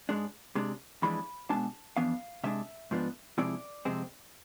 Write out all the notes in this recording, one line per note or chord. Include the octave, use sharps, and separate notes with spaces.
G#2 G#3 D4
C3 G#3 D4
F2 E3 G#3 D4 B5
B2 G#3 D4 A5
F2 E3 B3 D4 F5
C3 G#3 D4 E5
G#2 F3 B3 D4
C3 F3 G#3 C4 E4 D5
F2 C3 G#3 C4